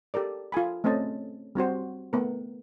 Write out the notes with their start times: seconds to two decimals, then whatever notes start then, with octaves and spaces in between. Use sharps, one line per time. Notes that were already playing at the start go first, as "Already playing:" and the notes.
0.14 G4 A4 A#4 D5
0.52 F4 A4 G#5 B5
0.84 A3 C4 C#4 C5 D#5 A5
1.55 G3 C4 F#4 C5
2.13 A3 B3 A#4